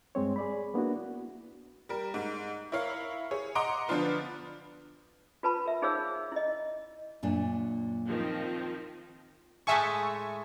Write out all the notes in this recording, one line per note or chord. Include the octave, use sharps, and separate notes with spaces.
G2 G#3 C4 C#5
G#4 D5 B5
A#3 B3 D4 E4 F#4
G3 A#4
G#2
E4 A#4 C#5 F5
G#4 C#5
D#5 F#5 A#5 C6 D6 D7
D3 F3 B3 D4 F4 B4
F4 B4 A5 B5
A#4 E5
D#4 G#4 C5 C#5 F5 E6
E4 D#5
F#2 A#2 D4
D#3 F3 C4
A2 G#3 A3 E5 G#5 C#6